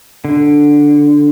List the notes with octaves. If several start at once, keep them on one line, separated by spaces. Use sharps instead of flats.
D3